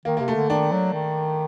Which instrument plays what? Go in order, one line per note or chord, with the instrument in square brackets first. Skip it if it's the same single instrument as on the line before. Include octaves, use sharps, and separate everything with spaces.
[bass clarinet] D#3 [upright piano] A#3
[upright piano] A#3
[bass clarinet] C3
[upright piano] A3
[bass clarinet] D3
[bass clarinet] D#3 [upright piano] D4
[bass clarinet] F#3
D#3